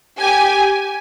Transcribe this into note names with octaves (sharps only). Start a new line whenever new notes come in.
G4 G#5